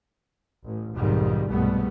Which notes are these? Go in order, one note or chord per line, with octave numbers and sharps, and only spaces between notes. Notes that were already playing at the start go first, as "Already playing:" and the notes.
A1
B1 F2 G#2 D#3 G3
C2 G#2 B2 G3 A3 B3